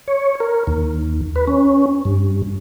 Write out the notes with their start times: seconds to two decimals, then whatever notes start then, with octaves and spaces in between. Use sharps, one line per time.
0.08 C#5
0.40 A#4
0.67 D#2
1.36 B4
1.47 C#4
2.05 G2